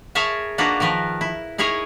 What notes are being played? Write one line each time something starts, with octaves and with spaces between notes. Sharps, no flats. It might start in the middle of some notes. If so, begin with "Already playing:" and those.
G#4 A#4 C#5 E5 G#5 A5
A#3 D4 D#4 F4 F#4 B4
D#3 F3 A#4 B4
E4
D#4 E4 G#4 A#4 C#5